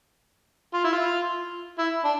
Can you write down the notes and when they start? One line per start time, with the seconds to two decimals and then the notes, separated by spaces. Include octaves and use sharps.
0.74 F4
0.84 E4
0.93 F4
1.79 E4
2.05 D4